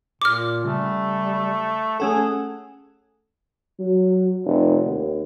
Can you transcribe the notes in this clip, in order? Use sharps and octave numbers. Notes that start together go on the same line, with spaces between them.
A#2 D6 F6
C#3 G3 A3
A3 C#4 G#4 A4 F#5
F#3
F1
D#2